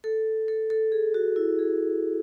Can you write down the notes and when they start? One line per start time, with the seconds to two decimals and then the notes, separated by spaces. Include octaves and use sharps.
0.04 A4
0.48 A4
0.70 A4
0.92 G#4
1.14 F#4
1.36 E4
1.59 G#4